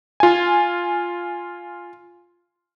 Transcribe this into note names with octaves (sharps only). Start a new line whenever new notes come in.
F4 G#5